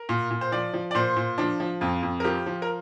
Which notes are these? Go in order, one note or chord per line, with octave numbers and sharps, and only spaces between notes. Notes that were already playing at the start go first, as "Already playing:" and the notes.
Already playing: A#4
A#2
A#2
C5
F3 D5
F3
D5
A#2 C5
A#2
F3 D4
F3
F2 F4
F2
A#4
F3 G4
F3
A#4